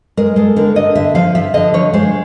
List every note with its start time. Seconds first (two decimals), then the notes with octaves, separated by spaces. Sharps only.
0.17 G#3 A#4
0.36 G#3 A4
0.56 D3 A#4
0.76 D3 D#5
0.95 D3 E5
1.15 F3 F5
1.35 F3 E5
1.54 D3 D#5
1.74 F3 C#5
1.93 G#3 C5